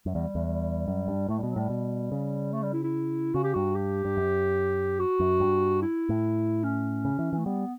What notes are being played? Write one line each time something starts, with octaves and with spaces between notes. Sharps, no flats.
F#2 G3
E2
E2
G3
F#2
G2
A2 A3
B2 G3
F#3
A2 G3
B2
C#3
A3
G3
E4
E4
C#3 F#4
G4
G2 F#4
G4
G2
F#2
F#4
F#2
G2
E4
A2
C#4
C#3
E3
E3
A3
G3 B3